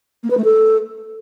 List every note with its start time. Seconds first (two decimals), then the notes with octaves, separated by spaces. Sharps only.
0.24 A#3
0.30 B4
0.37 A3
0.44 A4